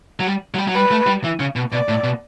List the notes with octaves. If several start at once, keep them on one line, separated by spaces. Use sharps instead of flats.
F#3
G3
F#3
G3
F#3
G3 B4
A3
G3
E3
C#3
B2
B2 D5
A2
B2